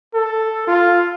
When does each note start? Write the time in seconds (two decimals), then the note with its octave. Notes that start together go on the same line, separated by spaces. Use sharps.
0.14 A4
0.67 F4